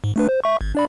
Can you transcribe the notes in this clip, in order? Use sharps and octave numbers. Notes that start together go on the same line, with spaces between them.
G#2
A3 D4 B4
C5
E5 C#6
G#1
D4 D5 B5